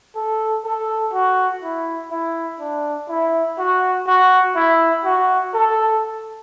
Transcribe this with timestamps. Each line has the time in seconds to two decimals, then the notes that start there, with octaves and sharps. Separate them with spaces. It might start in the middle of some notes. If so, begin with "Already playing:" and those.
0.16 A4
0.64 A4
1.13 F#4
1.63 E4
2.11 E4
2.60 D4
3.09 E4
3.59 F#4
4.07 F#4
4.56 E4
5.05 F#4
5.54 A4